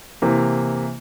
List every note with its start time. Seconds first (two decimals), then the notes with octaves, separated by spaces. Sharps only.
0.22 C3 E3 A#3